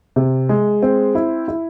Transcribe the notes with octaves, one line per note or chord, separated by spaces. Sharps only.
C3
G#3
C4
E4
E4